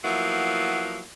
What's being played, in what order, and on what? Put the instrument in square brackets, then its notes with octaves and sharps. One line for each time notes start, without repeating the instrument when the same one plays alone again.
[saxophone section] F3 F#3 A#3 B3 E4